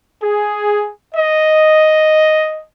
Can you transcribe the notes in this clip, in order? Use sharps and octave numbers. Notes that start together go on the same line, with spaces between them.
G#4
D#5